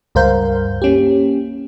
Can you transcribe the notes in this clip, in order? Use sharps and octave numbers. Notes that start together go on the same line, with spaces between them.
C#2 G2 A#4 C5 F5 G6
A#3 C#4 G4